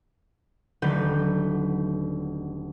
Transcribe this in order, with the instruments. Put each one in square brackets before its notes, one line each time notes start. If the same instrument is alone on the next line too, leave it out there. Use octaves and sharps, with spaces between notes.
[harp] D#1 D3 F#3 A3 B4 G6